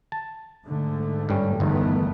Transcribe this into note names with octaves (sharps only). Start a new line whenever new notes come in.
A5
G#2 D3 A3
G2 G3 C#4
G1 E2 D#3 A3 B3